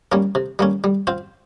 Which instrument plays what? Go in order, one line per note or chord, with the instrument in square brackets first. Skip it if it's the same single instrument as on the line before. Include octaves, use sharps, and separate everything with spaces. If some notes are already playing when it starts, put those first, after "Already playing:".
[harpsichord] G3 A#3 C#4
C3
G3 A#3 C#4
G3
C4 F4 C5